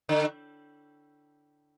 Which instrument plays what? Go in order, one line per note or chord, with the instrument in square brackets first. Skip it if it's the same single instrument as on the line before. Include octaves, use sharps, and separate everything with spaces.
[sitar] D3